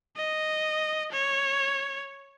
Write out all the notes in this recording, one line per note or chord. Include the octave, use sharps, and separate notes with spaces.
D#5
C#5